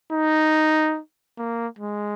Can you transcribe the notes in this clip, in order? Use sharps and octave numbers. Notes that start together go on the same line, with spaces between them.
D#4
A#3
G#3